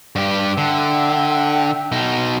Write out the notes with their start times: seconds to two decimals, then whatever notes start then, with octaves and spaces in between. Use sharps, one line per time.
0.16 G2 G4
0.58 D3 E5 G5 E6
1.92 B2 D#4